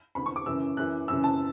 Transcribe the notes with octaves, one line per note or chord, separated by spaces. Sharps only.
E2 D3 B5
C#6
D6
F#2 C#3 E3 E6
F#2 E3 F#6
F#2 C#3 E3 E6
A5